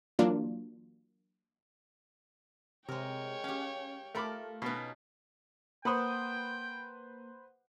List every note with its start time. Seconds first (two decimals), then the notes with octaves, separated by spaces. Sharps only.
0.19 E3 F#3 A#3 D4 F4
2.88 C3 G#3 A#4 C#5 G5
3.44 C#4 G4 F5
4.15 A3 F4 A4 A#4 B5 D6
4.62 B2 B3 C#4 D#4
5.85 A#3 B4 C5 F#5 G5 B5 D#6